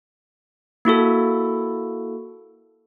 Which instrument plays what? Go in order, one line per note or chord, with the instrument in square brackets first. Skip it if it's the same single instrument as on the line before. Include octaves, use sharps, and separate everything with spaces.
[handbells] A#3 E4 F#4 A4